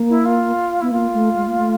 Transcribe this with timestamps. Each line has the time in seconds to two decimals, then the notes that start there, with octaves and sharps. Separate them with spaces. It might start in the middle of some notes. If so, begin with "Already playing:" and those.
Already playing: A#3
0.09 E4
0.25 F4
0.81 B3 E4
0.91 A#3 F4
1.14 A3
1.36 G#3
1.48 A#3
1.58 A3